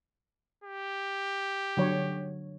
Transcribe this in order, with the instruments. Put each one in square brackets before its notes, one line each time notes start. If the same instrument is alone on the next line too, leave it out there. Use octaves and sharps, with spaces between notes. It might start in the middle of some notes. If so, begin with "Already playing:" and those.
[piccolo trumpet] G4
[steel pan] D3 F#3 C#5